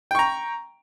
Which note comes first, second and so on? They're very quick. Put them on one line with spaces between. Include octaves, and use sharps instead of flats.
G5 C#6 A#5